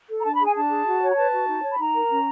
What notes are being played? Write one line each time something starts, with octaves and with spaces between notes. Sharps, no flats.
A4
A#5
D4 A5
G#4 B5
G#5
D4 A5
G#4
F#4
C#5
A#5
B4 A5
F#4
D#4
C#5
B5
D#4 A#5
A#4
C#4